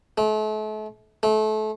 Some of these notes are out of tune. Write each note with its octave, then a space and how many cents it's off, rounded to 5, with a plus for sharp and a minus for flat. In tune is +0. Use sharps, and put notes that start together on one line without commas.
A3 -40
A3 -30